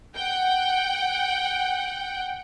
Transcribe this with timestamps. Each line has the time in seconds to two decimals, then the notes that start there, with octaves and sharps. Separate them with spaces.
0.16 F#5 G5